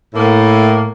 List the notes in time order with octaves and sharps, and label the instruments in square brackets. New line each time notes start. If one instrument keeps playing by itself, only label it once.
[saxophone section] A2 A#3